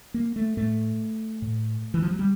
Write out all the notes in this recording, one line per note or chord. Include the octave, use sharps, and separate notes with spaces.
A#3
A3
A2 A3
A2
E3
F3
F#3
G3